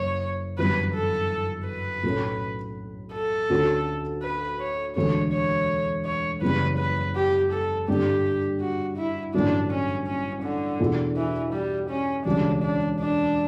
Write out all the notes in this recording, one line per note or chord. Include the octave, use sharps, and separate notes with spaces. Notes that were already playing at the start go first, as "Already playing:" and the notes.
Already playing: F#1 C#5
G1 F#2 E3 G3 B3 B4
A4
B4
B1 A2 F#3 A3 C#4
A4
D2 D3 A3 C#4 F#4
B4
C#5
E1 D2 D3 A3 C#5
C#5
C#5
F#1 E2 C#3 G3 B4
B4
G4
A4
G2 D3 G3 D4 G4
F#4
E4
A1 G2 D3 F#3 A3 D4
C#4
C#4
D3
E2 B2 A3 D4 F#4
E3
G3
C#4
E1 D2 C#3 G3 D4
D4
D4